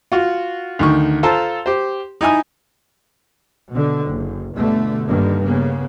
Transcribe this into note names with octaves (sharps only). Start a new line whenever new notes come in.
F4 F#4
D2 D#3 C#6
F4 A4 C5 A5 A#5
G4 C5
D#4 E4 G#5 D#6
B2 D3
F#1
G1 B2 D3 A3
G2 D3 D#3 A#3
C#3 A#3 B3